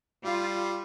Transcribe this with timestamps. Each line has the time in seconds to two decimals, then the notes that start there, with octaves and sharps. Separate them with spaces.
0.25 G3 F4